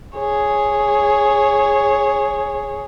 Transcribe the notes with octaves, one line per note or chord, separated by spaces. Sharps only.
G#4 C#5